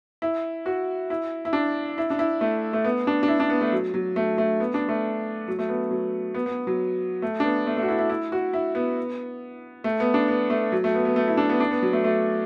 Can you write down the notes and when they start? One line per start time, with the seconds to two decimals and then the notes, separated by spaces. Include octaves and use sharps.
0.22 E4
0.66 F#4
1.10 E4
1.45 E4
1.53 D4
1.98 E4
2.10 D4
2.19 E4
2.41 A3
2.73 A3
2.85 B3
3.07 D4
3.23 D4
3.28 E4
3.40 D4
3.50 B3
3.61 A3
3.72 F#3
3.94 F#3
4.16 A3
4.38 A3
4.60 B3
4.74 D4
4.89 A3
5.48 F#3
5.59 A3
5.69 B3
5.91 F#3
6.35 B3
6.46 B3
6.67 F#3
7.22 A3
7.40 D4
7.44 B3
7.67 A3
7.77 A3
7.82 F#4
7.89 E4
7.99 E4
8.09 E4
8.32 F#4
8.53 E4
8.75 B3
9.84 A3
10.00 B3
10.14 D4
10.28 B3
10.50 A3
10.72 F#3
10.84 A3
10.95 B3
11.05 B3
11.16 A3
11.28 E4
11.37 D4
11.49 B3
11.60 D4
11.71 B3
11.82 F#3
11.93 A3
12.04 A3